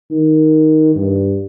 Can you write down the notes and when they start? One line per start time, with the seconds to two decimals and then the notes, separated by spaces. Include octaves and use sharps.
0.11 D#3
0.95 G2